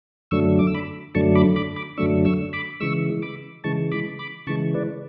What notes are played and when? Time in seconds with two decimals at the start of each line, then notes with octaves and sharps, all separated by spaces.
0.31 F#2 D3 F#3 A3 D4 C#6 E6
0.59 D6
0.67 E6
0.74 B5 D6
1.15 F#2 D3 F#3 A3 D4 A5 C#6
1.35 B5 D6
1.56 B5 D6
1.76 B5 D6
1.97 F#2 D3 F#3 A3 D4 C#6 E6
2.25 C#6 E6
2.53 B5 D6
2.80 C#3 E3 G#3 C#6 E6
3.22 B5 D6
3.64 C#3 E3 G#3 A5 C#6
3.91 B5 D6
4.19 B5 D6
4.47 C#3 E3 G#3 A5 C#6
4.74 B4 D5